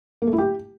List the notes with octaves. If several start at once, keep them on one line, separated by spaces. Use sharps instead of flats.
A#3
A3
E4
G4